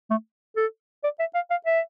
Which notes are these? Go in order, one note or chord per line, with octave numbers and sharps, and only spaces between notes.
A3
A4
D5
E5
F5
F5
E5